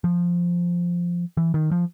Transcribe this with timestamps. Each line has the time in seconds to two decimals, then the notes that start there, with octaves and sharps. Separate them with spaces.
0.04 F3
1.37 E3
1.54 D#3
1.72 F3